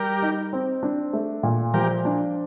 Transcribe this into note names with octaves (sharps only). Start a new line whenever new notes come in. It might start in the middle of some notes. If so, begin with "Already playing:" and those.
Already playing: G3 G4 A#4
D#4
C4
D4
A3
A#2
F3 G4 A#4
D4